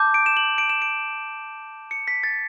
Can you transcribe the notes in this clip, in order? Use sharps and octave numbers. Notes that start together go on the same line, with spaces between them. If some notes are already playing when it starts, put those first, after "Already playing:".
Already playing: A5 D6 G6
D7
E7
F#7
D7
E7
D7
C#7
B6
A6